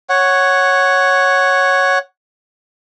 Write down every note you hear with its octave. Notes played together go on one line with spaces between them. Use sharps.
C#5 F#5